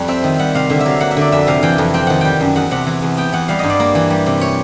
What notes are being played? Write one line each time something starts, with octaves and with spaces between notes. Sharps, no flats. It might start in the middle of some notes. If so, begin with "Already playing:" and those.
Already playing: F2 G3
C4 E5
D#3
G3 F#5
C3 F5
D3 E5
E5
F#3 F5
A#3 F#5
E5
D3 D5
F2 E5
C3 F5
E3 G5
F2
C4 G5
D#3 F#5
G3 G5
F#2
E2 F#5
C3 F#5
E3
E2
B3 G5
E3 F#5
G3 F5
G2 D#5
D5
A#3
E3
G3
C3
C#5